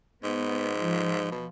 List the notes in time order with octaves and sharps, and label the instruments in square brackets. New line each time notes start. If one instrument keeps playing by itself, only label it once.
[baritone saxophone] G#2 [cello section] B3
[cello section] F3
[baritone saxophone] B2